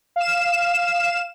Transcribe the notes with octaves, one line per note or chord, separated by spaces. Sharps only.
F5 E7